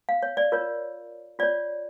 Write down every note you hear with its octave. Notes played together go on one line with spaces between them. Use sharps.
F5
C#5
D5
F4 A#4 C#5
F4 C#5 D5